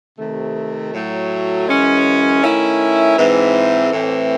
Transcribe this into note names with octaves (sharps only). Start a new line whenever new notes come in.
C3 D#3 A3
A2 F#3 A3
F#2 E3 G#3 C#4
D#3 A3 C#4 E4
G#2 E3 C4
A2 E3 C4